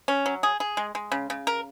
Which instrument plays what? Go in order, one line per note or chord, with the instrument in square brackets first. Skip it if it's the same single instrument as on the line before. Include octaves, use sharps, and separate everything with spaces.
[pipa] C#4
F#3
G#4
G#4
G#3
G#3
C#3
C#3
A#4